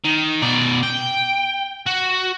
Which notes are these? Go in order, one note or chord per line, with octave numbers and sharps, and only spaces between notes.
D#3
B2 D5
G5
F#4